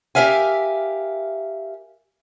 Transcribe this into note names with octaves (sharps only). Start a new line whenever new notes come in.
G4 A4 A#4 E5 F5 G#5